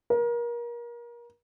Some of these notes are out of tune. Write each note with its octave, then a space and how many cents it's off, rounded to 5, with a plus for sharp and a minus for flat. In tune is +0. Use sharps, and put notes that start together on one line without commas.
A#4 +30